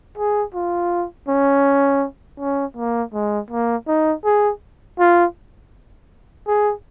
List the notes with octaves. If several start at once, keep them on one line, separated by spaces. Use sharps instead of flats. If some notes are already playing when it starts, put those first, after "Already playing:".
G#4
F4
C#4
C#4
A#3
G#3
A#3
D#4
G#4
F4
G#4